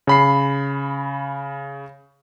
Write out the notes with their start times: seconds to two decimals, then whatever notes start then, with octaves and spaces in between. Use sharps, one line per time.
0.07 C#3 B5 C7